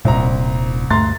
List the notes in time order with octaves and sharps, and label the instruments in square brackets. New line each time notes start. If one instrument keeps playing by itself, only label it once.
[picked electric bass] D#1 A#2 [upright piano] C2 C4 A#5
[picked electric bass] D2 G2 A3 [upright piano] A#5 C6 A6